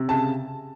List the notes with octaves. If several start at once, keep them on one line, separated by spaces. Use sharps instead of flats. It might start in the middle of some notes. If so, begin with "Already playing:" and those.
Already playing: C3
C#3 A5